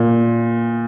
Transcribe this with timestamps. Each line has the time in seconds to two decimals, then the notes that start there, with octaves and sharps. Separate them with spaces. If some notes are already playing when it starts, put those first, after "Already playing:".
Already playing: A#2